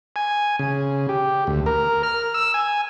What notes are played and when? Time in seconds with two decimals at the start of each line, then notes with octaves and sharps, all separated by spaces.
0.16 G#5
0.59 C#3
1.09 G4
1.47 D2
1.66 A#4
2.03 F6
2.34 E6
2.54 G#5